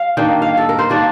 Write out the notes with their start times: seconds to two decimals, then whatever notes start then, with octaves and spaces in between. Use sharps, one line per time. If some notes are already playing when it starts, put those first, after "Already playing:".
Already playing: F5
0.17 D#3 A#3 D4 G5
0.42 F5
0.57 A4
0.69 A#4
0.79 C5
0.89 D#3 A#3 D4 D5